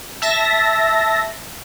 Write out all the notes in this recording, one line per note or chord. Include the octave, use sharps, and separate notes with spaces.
E5 A5 A#6